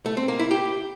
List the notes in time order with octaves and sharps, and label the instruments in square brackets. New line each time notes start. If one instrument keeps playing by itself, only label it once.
[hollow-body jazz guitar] A3
C4
A#3
E4
G4